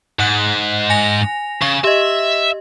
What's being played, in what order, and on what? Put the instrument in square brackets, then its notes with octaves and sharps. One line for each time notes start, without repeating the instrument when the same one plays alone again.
[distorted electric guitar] G#2 [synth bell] F#5 F#6
[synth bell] G#5 A#6 F7
[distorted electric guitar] C#3 [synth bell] C#6
[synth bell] G4 D#5 [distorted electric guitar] E5